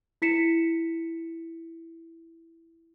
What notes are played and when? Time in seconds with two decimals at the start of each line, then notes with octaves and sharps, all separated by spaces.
0.22 E4 B6 C#7 E7